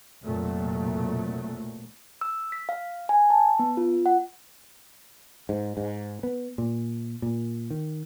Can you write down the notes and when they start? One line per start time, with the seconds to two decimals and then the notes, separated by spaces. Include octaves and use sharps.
0.23 F1 B1 F2 A#2 F#3 A3
2.21 E6
2.52 B6
2.69 F5
3.09 G#5
3.30 A5
3.59 B3
3.77 F4
4.06 F#5
5.49 G#2
5.77 G#2
6.23 B3
6.58 A#2
7.22 A#2
7.70 D#3